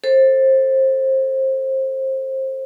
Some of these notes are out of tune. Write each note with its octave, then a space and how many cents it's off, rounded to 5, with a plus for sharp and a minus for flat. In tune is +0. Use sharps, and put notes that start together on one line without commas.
A4 +0 C5 +25